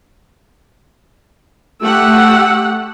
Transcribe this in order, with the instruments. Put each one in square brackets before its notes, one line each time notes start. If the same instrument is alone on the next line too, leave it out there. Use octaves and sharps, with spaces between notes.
[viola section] A3 F#5 [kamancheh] G4 E6